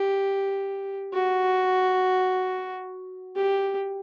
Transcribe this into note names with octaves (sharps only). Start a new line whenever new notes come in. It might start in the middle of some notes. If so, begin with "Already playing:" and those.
Already playing: G4
F#4
G4